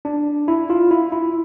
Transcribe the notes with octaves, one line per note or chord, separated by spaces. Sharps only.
D4
E4
F4
E4
E4